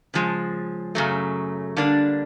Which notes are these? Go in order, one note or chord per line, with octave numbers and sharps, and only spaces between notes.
C#3 F3 G#3
F#2 C#3 F#3 A3
D3 G3 A#3 D4